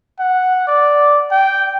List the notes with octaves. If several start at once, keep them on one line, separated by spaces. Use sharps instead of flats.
F#5
D5
G5